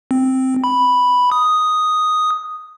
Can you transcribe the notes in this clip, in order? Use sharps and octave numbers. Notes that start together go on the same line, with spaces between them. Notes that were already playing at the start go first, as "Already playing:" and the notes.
C4
B5
D#6